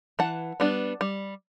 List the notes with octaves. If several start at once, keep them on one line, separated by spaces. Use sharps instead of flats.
E3 F#5 A5
G3 B3 D4
G3